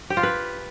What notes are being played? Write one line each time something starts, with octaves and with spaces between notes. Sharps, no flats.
G4
F4
B4